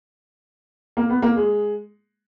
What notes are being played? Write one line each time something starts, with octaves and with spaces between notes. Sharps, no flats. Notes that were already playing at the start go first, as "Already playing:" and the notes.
A#3
B3
A#3
G#3